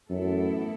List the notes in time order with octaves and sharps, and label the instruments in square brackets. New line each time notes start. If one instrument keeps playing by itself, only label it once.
[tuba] F#2 [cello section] A2 E3 B3 E4 A4